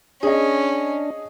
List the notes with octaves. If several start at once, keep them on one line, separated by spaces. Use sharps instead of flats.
C#4 D4 G#4 D#5